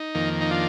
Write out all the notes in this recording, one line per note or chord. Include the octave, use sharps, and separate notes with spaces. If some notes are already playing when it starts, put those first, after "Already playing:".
Already playing: D#4
F2 D#3 A#3
D#4
D4 F4